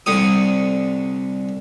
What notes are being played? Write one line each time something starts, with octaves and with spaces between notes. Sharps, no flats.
C2 D3 D#6